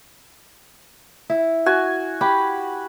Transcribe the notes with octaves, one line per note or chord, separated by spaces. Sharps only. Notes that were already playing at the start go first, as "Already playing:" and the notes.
E4
F#4 G#5
G4 B5